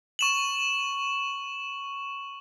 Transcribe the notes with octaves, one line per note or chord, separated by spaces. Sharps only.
C#6 E7 F#7